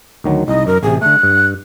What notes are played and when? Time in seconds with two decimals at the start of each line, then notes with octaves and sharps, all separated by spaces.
0.24 D2 D#3 F#3
0.48 C2 D#4 D#5
0.67 F#2 A#4
0.83 A1 C3 G#4
1.01 D3 A3 F#6
1.23 G2